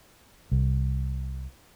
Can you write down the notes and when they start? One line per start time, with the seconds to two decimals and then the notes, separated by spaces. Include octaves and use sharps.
0.52 C2